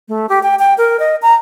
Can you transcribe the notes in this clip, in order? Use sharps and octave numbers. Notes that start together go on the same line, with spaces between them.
A3
G4
G5
G5
A#4
D#5
A#5